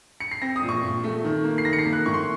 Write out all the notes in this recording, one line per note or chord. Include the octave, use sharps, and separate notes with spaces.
C#7
C7
C4 A#6
D#6
A#2
C#6
A#2
A3
D#3
A#3
C7
D#3 A#6
C#7
C7
A#3
F#6
A2 C#6
C6